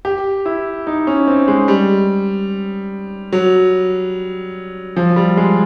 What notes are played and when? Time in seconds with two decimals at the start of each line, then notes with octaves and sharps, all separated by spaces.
0.05 G4
0.46 E4
0.87 D#4
1.07 C#4
1.27 C4
1.48 G#3
1.68 G3
3.33 F#3
4.97 F3
5.16 G3
5.37 G#3